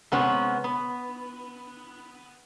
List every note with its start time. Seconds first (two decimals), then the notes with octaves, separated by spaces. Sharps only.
0.12 C3 G#3 B3 C#4
0.64 B3